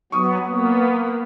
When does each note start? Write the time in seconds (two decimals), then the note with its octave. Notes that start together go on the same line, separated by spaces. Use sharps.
0.12 F#3 B3 C#6 D#6
0.47 A#3 B3